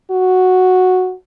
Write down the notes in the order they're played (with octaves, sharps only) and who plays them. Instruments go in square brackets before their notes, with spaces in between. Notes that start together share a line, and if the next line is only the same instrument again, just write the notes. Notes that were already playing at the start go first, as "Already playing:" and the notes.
[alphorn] F#4